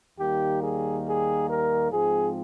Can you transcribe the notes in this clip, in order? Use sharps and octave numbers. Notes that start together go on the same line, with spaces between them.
D#2 D#3 G3 A#3 G4
G#4
G#4
A#4
G#2 F3 G#3 C4 G#4